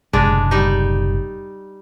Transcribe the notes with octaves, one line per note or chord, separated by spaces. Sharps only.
F#1 A2 C3 G#3 D4
G3 D#4